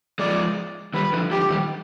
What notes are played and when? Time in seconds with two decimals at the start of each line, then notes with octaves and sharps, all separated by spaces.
0.19 F3 G#3 D5
0.94 D#3 G3 B4
1.13 D3 F3
1.31 D3 F3 G4
1.50 D#3 G3